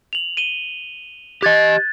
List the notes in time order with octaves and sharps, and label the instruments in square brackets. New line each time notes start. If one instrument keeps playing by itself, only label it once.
[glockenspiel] F7 F#7
D#7 E7 G7
[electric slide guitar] G4 D#5 [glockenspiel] F#6 G#6 A6